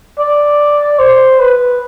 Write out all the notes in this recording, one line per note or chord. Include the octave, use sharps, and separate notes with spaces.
D5
C5
B4